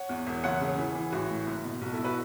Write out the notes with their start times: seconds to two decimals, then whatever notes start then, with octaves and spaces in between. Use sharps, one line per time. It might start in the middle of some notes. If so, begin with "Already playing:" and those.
Already playing: C#5 F#5
0.09 E2
0.27 E1
0.44 F#1 C#5 F#5
0.61 C#3
0.78 E3
0.95 E3
1.12 A1 F#4
1.30 A2
1.47 F#1
1.64 B2
1.81 B1 F#4
1.93 E4 A4
1.98 B1
2.04 F#4 B4